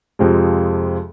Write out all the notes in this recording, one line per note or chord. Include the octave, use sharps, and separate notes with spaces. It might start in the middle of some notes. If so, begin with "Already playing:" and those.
F2 C3 F3 G#3